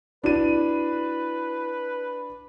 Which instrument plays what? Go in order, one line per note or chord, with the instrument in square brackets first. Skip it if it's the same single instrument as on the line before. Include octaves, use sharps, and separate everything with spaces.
[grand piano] D4 D#7 [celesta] E4 F#4 [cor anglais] B4